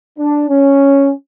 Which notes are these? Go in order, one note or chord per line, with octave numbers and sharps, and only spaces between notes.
D4
C#4